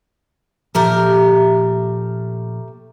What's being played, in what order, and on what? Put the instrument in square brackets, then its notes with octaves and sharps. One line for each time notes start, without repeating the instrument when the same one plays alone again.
[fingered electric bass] A#2 F3 [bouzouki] A3 G4 A#4